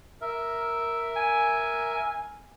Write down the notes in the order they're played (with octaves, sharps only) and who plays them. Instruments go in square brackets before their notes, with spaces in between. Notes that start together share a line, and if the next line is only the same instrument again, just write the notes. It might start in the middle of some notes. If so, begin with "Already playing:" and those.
[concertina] A#4 E5
[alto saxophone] G#5